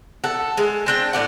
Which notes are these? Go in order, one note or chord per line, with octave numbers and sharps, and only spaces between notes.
A4 F#5
G#3
C4 D4 G5
A2 D5 F#5